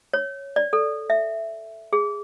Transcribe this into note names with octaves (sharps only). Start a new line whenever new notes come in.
C#5
D5
A4
E5
G#4